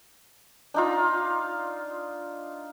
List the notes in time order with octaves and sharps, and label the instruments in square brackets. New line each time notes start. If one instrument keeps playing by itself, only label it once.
[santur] D4 D#4 F4